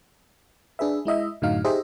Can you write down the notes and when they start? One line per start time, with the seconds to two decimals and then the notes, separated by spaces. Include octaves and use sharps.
0.79 D4 G#4 B4 E5
1.05 G#3 E4 D#5 E5
1.42 F#2 A2 D3 F#3 D#4 F5
1.64 D#4 G4 G#4 C5 D#5 E5